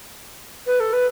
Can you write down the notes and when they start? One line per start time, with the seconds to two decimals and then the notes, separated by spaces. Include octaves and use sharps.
0.67 B4
0.80 A4
0.93 B4